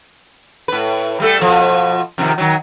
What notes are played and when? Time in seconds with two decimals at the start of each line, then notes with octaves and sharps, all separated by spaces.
0.68 A2 B4
1.20 G3 A3 A4
1.39 B2 F3
2.18 F2 C3 D#3
2.38 D#3 F#3